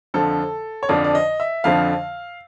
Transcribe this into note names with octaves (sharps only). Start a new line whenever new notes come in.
F2 D3 F3 A4
C#5
F2 D3 F3 D5
D5
D#5
E5
F2 D3 F3 F5